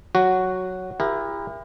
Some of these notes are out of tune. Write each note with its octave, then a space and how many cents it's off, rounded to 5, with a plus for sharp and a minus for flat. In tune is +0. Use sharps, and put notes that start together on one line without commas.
F#3 +0 F#4 +0
E4 +20 G4 +45 A#4 +25